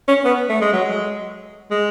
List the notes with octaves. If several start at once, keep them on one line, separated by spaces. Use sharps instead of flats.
C#4
B3
A3
G#3
F#3
G#3
G#3